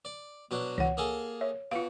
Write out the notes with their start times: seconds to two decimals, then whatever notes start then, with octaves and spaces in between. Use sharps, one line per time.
0.05 D5
0.51 B2 F#3 D4
0.78 C#2 E3 C#5 F#5
0.97 A#3 G#4 A4
1.41 C#5 E5
1.72 B2 F4 F5